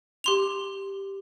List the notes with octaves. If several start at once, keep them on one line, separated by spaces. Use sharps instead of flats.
G4 C6 F7